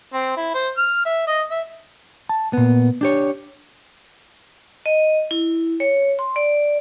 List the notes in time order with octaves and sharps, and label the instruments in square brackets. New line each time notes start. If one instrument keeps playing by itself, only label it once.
[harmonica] C4
E4
C5
F6
E5
D#5
E5
[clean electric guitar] A5
A#2 B3
D4 G4 C#5
[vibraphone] D#5
E4
C#5
C6
D5